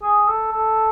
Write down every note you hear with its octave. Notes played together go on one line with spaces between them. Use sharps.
G#4
A4
A4